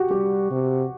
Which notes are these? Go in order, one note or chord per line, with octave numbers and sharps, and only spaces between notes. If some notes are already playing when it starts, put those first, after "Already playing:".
Already playing: F#4 G4
G3 G4
C3